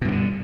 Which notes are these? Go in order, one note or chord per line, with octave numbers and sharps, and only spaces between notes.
G2 B2 D3 E3